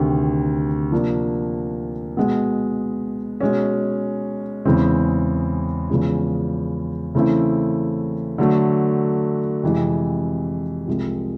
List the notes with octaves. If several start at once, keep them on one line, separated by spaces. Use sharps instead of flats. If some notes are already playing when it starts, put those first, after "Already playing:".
Already playing: D2 C3 D#3
C3 F3 A#3 D4
B2 G#3 B3
B2 G#3 C#4
E2 C#3 E3 G#3 C4
E2 C#3 F3 G#3
C#3 E3 A3 C4 E4
D3 F#3 A3
F2 C3 E3 G#3
C2 C3 F3 G#3